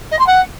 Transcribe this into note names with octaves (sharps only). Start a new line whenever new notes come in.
D#5
C6
F#5